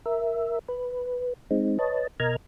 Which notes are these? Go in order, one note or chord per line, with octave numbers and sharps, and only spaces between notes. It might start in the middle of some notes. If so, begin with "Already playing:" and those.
A#4 E5
B4
G#3 C4 D#4
B4 C#5 D#5 A5
B2 A#4 D#5 A#5 F6 G#6